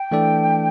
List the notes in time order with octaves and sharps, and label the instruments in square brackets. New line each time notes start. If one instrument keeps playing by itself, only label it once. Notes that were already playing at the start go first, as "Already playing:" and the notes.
Already playing: [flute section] G5
[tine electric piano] E3 A3 D4 A4 D5